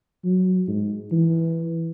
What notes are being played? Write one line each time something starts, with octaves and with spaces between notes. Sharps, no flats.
F#3
G#2
E3